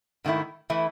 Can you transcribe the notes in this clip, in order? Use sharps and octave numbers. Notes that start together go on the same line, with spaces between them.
G#2 D#3 A3 E4
E3 A3 E4